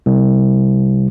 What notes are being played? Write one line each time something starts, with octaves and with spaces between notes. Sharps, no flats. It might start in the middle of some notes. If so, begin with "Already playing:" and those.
C2